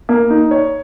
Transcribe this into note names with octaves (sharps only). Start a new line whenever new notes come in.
A#3
D#4
C#5